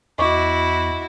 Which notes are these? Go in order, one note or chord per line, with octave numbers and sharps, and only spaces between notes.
E2 E4 F#4 D#5 C#6 D6